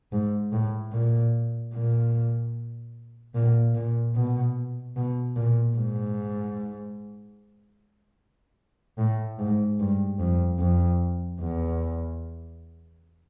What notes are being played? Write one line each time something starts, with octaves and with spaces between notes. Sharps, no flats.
G#2
A2
A#2
A#2
A#2
A#2
B2
B2
A#2
G#2
A2
G#2
G2
F2
F2
E2